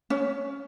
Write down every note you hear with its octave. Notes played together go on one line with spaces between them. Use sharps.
C#4